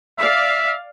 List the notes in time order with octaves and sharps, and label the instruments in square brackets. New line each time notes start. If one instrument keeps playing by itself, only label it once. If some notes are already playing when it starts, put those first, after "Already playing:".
[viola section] D5 F5 [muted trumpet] E5